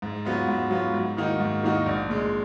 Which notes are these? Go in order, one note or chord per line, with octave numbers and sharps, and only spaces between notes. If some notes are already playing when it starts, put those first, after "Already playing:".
G#2
F#3 B3 F4
G#2
F#3 B3 F4
G#2
D#3 A#3 D#4 F#4
G#2
D#3 A#3 D#4 F#4
A#1
A#2 G#3